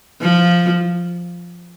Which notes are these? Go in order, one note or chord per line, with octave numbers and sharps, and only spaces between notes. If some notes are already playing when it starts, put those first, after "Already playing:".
F3